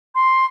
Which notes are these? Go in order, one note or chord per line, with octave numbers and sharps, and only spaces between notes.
C6